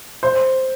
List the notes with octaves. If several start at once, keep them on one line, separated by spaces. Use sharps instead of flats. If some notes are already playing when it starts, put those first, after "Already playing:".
C5